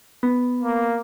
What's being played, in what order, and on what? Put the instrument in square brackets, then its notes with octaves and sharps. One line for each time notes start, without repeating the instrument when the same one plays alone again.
[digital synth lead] B3
[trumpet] A#3